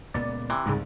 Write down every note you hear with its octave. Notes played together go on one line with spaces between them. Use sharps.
C#2 A#2 B3 D5
C3 E3
C2 F2 G#2 C#3